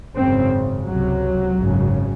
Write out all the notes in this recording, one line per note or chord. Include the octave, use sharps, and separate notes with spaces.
G#1 F#2 C#3 C4
C#2 C3 F#3
G#1 F#2 C#3